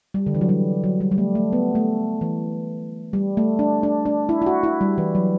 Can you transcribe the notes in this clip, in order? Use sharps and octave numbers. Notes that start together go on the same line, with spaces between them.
G3
D3
E3
F#3
G3
F#3
G3
G3
A3
A3
B3
A3
E3
G3
A3
D4
D4
D4
E4
E4
F#4
E4
G3
E3
F#3